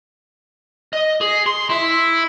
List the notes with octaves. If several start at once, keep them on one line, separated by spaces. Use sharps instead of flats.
D#5
G#4
C6
E4 E5